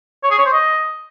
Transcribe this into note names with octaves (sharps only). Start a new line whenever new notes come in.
C#5
G#4
C#5
C5
D#5